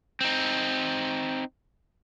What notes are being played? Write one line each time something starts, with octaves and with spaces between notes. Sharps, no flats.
C4 D#4